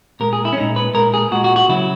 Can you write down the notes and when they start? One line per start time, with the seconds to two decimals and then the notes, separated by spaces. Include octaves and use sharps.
0.20 A#2 G#3 A#4
0.33 G#4
0.45 E4
0.53 C#4
0.57 A#2 G#3 D#4
0.76 B4
0.94 A#2 G#3 A#4
1.14 G#4
1.31 A#2 G#3 F#4
1.44 F#4
1.56 F#4
1.69 C#3 F#3 E4